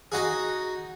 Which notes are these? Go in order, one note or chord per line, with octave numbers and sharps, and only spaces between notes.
D#4 F#4 G#4